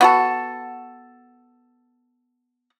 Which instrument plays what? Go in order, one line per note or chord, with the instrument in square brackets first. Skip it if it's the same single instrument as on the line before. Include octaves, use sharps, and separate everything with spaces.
[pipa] B3 F#4 A4